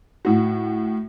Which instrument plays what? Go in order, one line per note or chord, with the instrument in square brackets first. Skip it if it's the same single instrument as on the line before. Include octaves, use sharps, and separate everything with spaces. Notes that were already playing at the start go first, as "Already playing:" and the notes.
[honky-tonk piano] A2 F#4